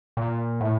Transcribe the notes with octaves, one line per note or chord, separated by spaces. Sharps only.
A#2
A2